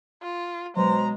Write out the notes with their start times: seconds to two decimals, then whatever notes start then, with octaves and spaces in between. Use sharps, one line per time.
0.22 F4
0.76 B2 F#3 G#3 C5 A#5